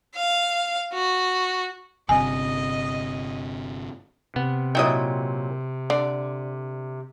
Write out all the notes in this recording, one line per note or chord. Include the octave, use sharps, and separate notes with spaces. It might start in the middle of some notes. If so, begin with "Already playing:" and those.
F5
F#4
G1 C3 D#5 G#5
C3 B3
A#2 F#3 D#4 E4 D#5 G5
D3 D5